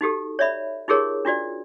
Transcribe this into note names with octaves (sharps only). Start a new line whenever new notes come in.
D#4 F#4 G4 A4
C#5 D5 E5 B5
D#4 F4 G4 G#4 A#4 C#5
D4 F4 F#4 D5